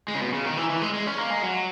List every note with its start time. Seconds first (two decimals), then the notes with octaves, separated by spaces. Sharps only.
0.08 G#3
0.15 C#3
0.21 B2
0.33 C#3
0.46 D#3
0.57 E3
0.70 E3
0.82 G#3
0.94 G#3
1.06 C#4
1.18 A#3
1.30 G#3
1.43 F#3